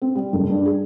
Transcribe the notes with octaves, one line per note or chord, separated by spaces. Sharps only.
C4
G3
F#1
G2
G#4